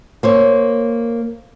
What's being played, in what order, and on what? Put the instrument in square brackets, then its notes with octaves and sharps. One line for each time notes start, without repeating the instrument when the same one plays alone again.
[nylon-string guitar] A#3 C5 C#5